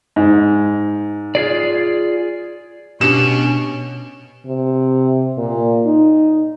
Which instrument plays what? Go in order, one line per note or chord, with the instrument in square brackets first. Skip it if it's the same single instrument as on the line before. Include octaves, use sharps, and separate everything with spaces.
[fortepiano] G#2
[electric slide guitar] F4 G#4 D5
[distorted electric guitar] B2 [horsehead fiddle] C#4 [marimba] D4 G4 [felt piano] E7
[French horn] C3
A#2
D#4